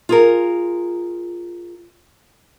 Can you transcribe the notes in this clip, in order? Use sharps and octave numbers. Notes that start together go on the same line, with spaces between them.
F4 G#4 A#4